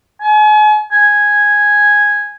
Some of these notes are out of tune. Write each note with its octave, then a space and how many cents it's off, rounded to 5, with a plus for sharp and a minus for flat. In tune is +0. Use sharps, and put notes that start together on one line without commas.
G#5 +40
G#5 -5